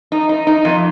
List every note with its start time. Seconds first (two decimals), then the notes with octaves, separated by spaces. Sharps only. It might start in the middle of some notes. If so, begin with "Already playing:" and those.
0.12 D#4
0.29 D#4
0.47 D#4
0.65 F2